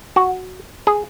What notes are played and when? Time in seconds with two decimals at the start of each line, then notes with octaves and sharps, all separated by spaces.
0.16 F#4
0.87 G#4